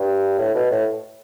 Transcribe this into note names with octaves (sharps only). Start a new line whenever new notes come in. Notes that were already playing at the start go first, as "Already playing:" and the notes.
Already playing: G2
A2
B2
A2